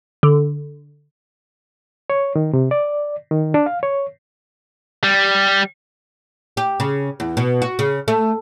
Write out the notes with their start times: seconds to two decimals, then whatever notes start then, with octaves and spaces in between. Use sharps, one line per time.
0.23 D3
2.10 C#5
2.36 D#3
2.53 C3
2.71 D5
3.31 D#3
3.54 D4
3.66 F5
3.83 C#5
5.03 G3
6.57 G4
6.80 C#3
7.20 E2
7.37 B2
7.62 F#4
7.79 C#3
8.08 A3